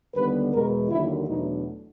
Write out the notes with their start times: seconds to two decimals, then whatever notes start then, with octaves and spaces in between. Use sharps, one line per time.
0.15 D#2 D3 G3 B3 B4
0.53 E2 B2 G#3 A#4
0.89 D#2 D3 F#3 A#3 E4
1.27 E2 B2 F#3 A3 D4 D#4